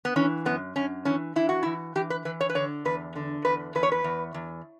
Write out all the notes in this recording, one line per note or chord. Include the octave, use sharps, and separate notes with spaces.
B3
E3 C#4
F#2 B3
F#2 C#4
E3 C#4
E3 E4
F#4
E3 E4
E3 G4
B4
E3 B4
C#5
B4
D3 C#5
E2 B4
D3
E2 B4
E2 B4
C#5
B4
E2
E2